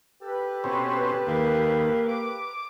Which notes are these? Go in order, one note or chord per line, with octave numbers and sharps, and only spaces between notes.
G4 A4 B4
B2 C4 C#4
D#2 A#3
D6